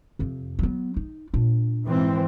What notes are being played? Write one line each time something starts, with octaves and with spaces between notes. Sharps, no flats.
F2 C3
F#3 B3
D#4
A#2 D4
G#2 E3 C4